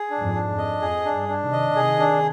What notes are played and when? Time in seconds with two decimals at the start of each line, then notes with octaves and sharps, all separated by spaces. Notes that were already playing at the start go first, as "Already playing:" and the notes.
Already playing: G#4
0.10 D4
0.19 F2 G#2
0.34 D4
0.50 F2
0.58 D#5
0.81 F2 G#4
1.05 D4
1.12 G2
1.28 D4
1.44 C3 D#3
1.52 D#5
1.75 C3 D#3 G#4
1.99 D4